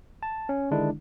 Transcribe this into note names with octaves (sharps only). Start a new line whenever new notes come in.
A5
C#4
D3 D#3 G#3 D4 E4